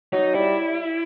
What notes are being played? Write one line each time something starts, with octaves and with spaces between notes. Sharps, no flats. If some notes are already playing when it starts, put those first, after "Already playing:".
F#3 D#4
G3 E4